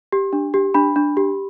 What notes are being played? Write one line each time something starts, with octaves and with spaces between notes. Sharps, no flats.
G4
D4
G4
D4 B5
D4
G4